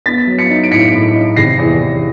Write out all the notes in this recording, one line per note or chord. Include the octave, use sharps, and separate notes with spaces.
B3 A6 B6
F#3
B6 C#7
D#4
D7
A2 B6 C#7
A2
D#4
C3 A#6 C7
E2
E2